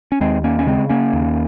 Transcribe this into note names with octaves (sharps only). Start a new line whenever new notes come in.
C#4
D#2 G#3 C4
A#3 C#4
C#4
C#3 G#3 C4
A#3 C#4
D#2